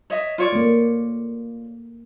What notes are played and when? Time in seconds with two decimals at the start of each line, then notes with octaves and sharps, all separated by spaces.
0.10 C#5 D#5 E5
0.38 F4 C#5 D5
0.52 A3 A#3